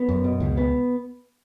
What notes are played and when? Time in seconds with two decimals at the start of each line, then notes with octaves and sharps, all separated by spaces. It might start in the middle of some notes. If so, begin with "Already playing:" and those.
Already playing: B3
0.09 F#2
0.24 B2
0.40 C#2
0.57 B3